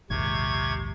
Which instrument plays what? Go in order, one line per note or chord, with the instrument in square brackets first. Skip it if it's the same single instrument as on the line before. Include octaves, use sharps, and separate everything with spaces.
[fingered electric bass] A#1 D#2 G#2 [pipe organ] C3 C#6 G#6